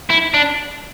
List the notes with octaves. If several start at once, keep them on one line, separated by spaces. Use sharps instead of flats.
E4
D4